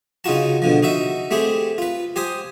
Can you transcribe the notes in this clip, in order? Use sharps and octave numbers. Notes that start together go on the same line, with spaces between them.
C#3 D#4 F4 F#4 A5
B2 D3 F3
D#4 F#4 E5
A3 C4 G4 G#4
F4 B4
G4 C5 G#5 D#6